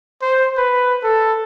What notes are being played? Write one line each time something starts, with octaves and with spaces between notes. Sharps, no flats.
C5
B4
A4